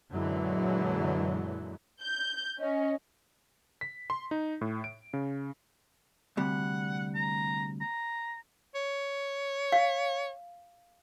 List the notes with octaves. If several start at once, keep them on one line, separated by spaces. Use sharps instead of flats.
F#2 A#2 D3 E3 F#3 G#3
G6
C#4 D#5
B6
C6
D#4
A2
D7
C#3
D2 C3 G3 F#5
A#5
A#5
C#5
F5